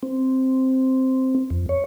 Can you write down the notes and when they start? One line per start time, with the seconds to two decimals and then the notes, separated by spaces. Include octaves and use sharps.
0.03 C4
1.50 F2
1.69 C#5